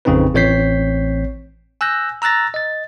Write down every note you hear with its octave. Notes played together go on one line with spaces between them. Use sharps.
A1 F2 C#3 C4 D#4 B4
A1 C4 C#5 G6 B6 C7
G#5 E6 F#6 G6 A#6
A#5 E6 F#6 A6 A#6
D#5 A6